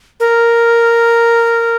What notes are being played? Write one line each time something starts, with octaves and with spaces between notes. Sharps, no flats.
A#4